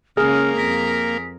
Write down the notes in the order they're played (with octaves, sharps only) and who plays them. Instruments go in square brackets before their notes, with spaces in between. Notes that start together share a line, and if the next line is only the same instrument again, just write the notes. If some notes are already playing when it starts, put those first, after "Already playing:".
[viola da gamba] C#3 G#3 C#4 [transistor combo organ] A#3 [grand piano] G#4 [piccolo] F6
[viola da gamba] F2 A#4 [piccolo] B6